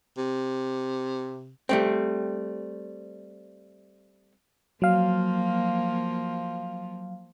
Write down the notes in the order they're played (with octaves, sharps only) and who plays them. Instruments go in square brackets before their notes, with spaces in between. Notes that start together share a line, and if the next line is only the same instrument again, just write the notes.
[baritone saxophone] C3
[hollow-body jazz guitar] G3 A3 C4
[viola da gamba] F3 A#3 [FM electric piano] F#3 F5